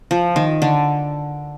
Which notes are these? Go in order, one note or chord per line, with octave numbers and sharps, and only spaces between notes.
F3
D#3
D3